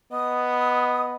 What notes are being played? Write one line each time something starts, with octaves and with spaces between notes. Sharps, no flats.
B3 D#5 D#6